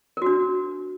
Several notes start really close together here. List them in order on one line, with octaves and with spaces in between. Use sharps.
A#4 F#4 D4